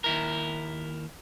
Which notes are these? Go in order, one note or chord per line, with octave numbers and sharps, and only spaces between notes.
D#2 E4 A#4